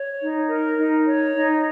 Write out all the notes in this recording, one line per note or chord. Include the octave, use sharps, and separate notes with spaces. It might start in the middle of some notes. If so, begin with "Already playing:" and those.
Already playing: C#5
D#4
A#4
D#4
C#5
D#4